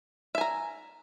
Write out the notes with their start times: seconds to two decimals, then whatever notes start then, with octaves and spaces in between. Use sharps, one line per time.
0.35 E5
0.38 G#5
0.41 A#5